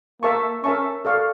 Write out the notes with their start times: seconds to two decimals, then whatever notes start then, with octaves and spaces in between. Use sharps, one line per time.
0.22 A#3 A#4 E5 A5 C#6
0.64 C#4 A#4 E5 A5 C#6
1.05 A4 D5 F5 C#6